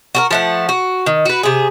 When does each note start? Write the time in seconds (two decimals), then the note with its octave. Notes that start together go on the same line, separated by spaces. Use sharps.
0.15 F#4 A4 A#4
0.31 F3 A3 F#5
0.69 F#4
1.06 D#3
1.26 F#4 B4
1.43 C3 G#4